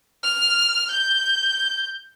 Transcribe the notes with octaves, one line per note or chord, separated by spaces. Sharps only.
F6
G6